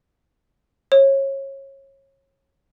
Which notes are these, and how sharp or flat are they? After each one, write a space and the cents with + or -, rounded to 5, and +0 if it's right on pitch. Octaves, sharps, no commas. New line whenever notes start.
C#5 -25